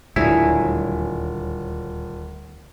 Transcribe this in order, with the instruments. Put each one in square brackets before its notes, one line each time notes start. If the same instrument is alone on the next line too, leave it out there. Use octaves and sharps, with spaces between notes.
[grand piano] D#1 [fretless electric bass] D2 A2 G3 [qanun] F#3 G#4 [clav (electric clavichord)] E4